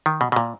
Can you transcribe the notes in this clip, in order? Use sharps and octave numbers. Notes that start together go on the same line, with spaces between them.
D#3
B2
B2
A#2